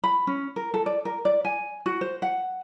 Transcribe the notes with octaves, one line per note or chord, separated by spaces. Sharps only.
B5
C#4
A#4
A4
D5
A#4
D5
G#5
F#4
C5
F#5